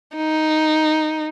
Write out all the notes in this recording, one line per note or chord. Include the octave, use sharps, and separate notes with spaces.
D#4